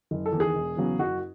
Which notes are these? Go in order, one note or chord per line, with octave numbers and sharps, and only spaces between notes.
F#1
A4
E2
D#3 G#4
E1
E2 C#3 F#3 B3
F#1 F#4